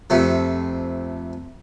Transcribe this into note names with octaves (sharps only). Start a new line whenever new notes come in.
F2 C3 A3